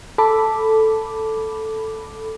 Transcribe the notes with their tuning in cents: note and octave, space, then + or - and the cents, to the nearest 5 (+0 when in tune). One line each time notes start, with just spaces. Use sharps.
A4 +0 B5 +0 D6 +0